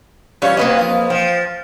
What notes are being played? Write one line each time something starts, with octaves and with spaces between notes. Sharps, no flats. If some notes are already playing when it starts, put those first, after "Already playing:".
E3 G3 C#4 F4 C#5
C3 F#3 A#3 B3 B4 D#5
F2 A2 F4
F3 G5